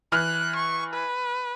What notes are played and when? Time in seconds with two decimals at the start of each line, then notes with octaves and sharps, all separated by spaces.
0.12 E3 F6 F#6
0.56 C#6
0.93 B4